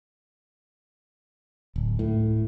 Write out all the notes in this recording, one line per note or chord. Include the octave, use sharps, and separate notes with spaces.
D1
A2